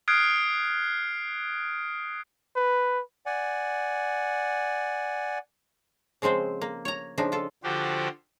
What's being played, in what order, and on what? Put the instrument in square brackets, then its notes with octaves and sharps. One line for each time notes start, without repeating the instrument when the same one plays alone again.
[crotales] D#6 F6 F#6 G#6 C7 D7
[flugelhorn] B4
[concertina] D5 F#5 G#5
[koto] C#3 F3 G#3 C4 C5
A#3
C#5 A#5
C#3 F3 D4 D#4
F4 A4
[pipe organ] D3 F3 F#4 G4 C5